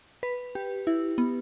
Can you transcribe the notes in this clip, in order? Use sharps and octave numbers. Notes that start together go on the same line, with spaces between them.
B4
G4
E4
B3